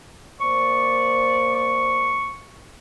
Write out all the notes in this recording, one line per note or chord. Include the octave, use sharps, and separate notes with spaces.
A#3 C5 D5 C#6
C#6